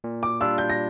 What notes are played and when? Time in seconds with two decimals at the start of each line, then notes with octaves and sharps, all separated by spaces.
0.04 A#2
0.23 D6
0.41 G3 D4 F4 E6
0.58 G6
0.70 A#6